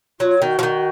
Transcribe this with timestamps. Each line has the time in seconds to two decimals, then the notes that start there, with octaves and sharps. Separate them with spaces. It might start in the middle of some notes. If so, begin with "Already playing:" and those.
0.20 F#3 F4
0.42 D#3 F#4
0.59 F3
0.63 D#3